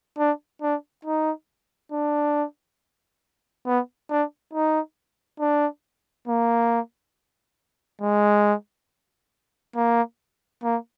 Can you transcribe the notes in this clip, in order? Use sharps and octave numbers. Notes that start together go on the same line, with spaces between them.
D4
D4
D#4
D4
B3
D4
D#4
D4
A#3
G#3
A#3
A#3